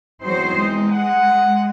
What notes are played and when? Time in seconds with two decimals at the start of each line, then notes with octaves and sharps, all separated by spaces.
0.22 E2 F#3 C4 D#4 C5
0.58 G#3
0.92 F#5